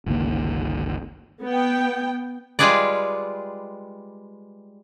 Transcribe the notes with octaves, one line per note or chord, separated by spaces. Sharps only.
G1 C#2 D#3 A#3
B3 G5
G3 G#3 F4 G#4 B4 D5